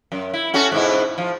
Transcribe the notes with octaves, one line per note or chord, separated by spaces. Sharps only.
F#2
E4
C#4 F#4 A4
G#2 B2 E4
F3